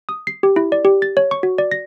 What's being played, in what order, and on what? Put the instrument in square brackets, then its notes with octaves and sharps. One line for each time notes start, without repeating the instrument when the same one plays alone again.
[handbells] D#6
C7
G4
E4
D5
G4
A6
C#5
C#6
F#4
D5
A#6